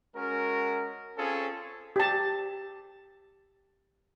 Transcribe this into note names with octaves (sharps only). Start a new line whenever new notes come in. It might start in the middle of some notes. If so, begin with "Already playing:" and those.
G#3 C#4 F#4 A#4
C4 C#4 F4 G#4 A4 C#5
G4 A5